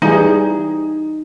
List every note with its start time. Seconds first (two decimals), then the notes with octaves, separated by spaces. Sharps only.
0.02 E3 G3 D#4 G#4